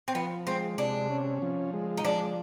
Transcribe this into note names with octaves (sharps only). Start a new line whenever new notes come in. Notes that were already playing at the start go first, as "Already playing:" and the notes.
C4
F3 B3
G#3 C4
C3 D4
C#4
F3
G#3
D#4
F3 D4